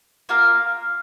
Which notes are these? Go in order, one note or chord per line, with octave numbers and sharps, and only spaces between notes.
A#3 F4 A#4 F5